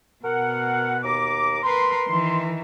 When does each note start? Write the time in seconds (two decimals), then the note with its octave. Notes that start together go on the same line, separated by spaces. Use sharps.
0.24 B2 A#4 F#5
1.03 D#2 A#5 D6
1.63 A#4 B4 C6
2.08 D#3 E3